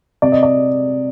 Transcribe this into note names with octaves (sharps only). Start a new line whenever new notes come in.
C3 D5
D#5
D5